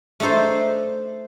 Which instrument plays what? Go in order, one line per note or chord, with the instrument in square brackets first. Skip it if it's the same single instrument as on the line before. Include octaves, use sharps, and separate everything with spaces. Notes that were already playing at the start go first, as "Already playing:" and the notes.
[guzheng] A3 D4 D#4 A4 C5